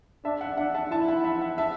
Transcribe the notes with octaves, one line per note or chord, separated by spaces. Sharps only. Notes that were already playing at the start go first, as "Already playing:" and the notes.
D4 E5 A5
F#5
D4 F#5
E5 A5
E4 E5 A5
F#5 B5
E5
F#5
E5 A5